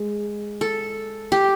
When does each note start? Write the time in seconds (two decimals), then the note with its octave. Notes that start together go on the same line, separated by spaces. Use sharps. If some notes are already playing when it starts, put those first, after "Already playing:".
Already playing: G#3
0.61 A4
1.32 G4